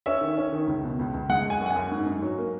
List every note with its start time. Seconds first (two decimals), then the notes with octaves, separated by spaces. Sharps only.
0.06 C#4 E5
0.21 D#3
0.37 C#4
0.52 D#3
0.67 C#2
0.84 B2
0.99 C#2
1.14 C#2
1.29 G#3 F#5
1.45 F#2
1.50 G#5
1.60 F#2
1.66 F#5
1.70 G#5
1.76 F#2
1.92 G#2
2.07 G#2
2.22 F#3
2.38 A#3